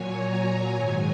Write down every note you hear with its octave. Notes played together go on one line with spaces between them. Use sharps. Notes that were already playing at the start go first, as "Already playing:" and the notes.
Already playing: A#2 F#3 C#5 G#5
A#5
G#5
G#2 D#3 F#3 G#5